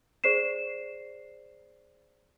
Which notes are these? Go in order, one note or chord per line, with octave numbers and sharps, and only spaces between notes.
G#4 C5 D5 C7 E7